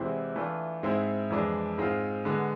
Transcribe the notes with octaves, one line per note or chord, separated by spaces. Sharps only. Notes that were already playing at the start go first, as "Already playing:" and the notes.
Already playing: E2 C3 G#3 C4 E4
E3 A3 D4 F4
G#2 G#3 C4 E4
F2 E3 G#3 D4
G#2 G#3 C4 F4
D3 G#3 B3